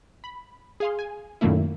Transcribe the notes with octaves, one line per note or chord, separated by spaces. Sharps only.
B5
G#4 F5 C6
G#5
F#2 A#2 D#3 A3 A#3 E4